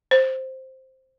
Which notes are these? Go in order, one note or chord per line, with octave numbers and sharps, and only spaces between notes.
C5